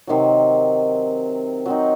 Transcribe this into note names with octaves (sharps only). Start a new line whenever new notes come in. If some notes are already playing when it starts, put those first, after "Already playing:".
C3 D#3 F#3
F#3 C4 D#4